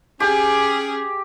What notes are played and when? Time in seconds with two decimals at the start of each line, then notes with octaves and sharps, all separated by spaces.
0.20 C#4 G4 G#4